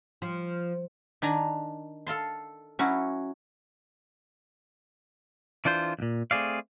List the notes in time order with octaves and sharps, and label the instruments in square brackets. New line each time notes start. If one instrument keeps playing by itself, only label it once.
[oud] F3
[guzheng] D#3 D4 G#5 A#5
A4 F5 A5 C6
F#3 C#4 E4 F#4
[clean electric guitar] E3 D4 F4 C5
C#2 A#2
A3 C4 G#4 D5 F5